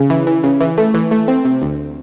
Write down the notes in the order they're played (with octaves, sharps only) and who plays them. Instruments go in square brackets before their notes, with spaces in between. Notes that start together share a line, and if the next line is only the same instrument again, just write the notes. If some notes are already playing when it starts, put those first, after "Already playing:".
Already playing: [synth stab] C#3
E3
E3
C#3
E3
A3
E3
A3
C4
C3
D2